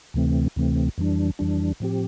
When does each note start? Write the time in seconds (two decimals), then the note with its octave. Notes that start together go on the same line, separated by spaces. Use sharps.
0.14 D2 C3 E3 A3 C4
0.56 D2 C3 E3 A3 C4
0.98 F2 E3 G3 D4
1.39 F2 E3 G3 D4
1.80 A2 F3 C4 G4